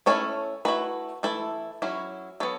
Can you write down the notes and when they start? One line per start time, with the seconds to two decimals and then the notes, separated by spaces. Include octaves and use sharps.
0.06 A3 C#4 E4 A4 C#5
0.65 A3 E4 F#4 B4
1.23 E3 A3 E4 A4
1.82 F#3 C#4 E4
2.40 F#3 B3 A4 C#5